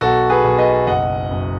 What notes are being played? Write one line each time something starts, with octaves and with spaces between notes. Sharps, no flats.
B1 F#4 A4
G#4 B4
B1
B4 D#5
F#1 D#5 F#5
F#2